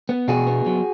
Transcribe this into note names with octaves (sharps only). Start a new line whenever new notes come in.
B3
B2 F#4 G#4
B3
F#3